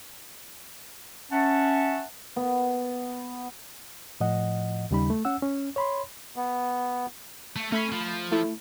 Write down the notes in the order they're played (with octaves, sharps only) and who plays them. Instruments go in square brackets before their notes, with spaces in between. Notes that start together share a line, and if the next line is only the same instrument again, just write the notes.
[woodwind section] C#4 E5 F#5 A5
[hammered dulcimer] B3
[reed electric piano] A2 F3 D#5 F#5
D#2 C#3 G3 D#4 B5
A3
C#4 F#5 E6
C#4
C#5 B5 C6
[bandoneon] B3
[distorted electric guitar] A3
[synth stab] A3 B5 C7 [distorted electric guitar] C#4
[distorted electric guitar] F3
[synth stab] A3 E4